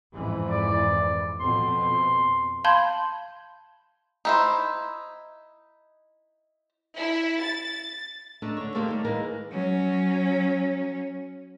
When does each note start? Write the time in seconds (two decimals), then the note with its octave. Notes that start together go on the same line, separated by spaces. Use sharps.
0.14 F2 G#2 E3
0.50 D5
1.40 F2 B2 C4 C6
2.64 F5 A5 B5 C6 G6 G#6
4.25 D#4 E4 C5
6.97 E4
7.42 A6
8.42 A3 D4 D#4
8.57 D3 C#5
8.75 A3 A#3 C4 D#4 G4
8.88 D#3 G3
9.05 E3 G#3 A#3 A#4 B4
9.51 F#3 C#4